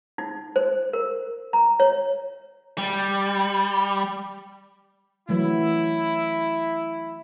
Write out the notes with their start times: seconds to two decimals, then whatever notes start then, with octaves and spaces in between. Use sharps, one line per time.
0.18 D#4
0.56 C5
0.93 A#4
1.53 A#5
1.80 C#5
2.78 G3
5.29 E3 F#3 A3 E4